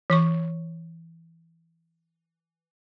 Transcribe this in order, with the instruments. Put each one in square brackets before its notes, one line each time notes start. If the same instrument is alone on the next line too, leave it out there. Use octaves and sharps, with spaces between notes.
[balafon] E3 C#5 C#6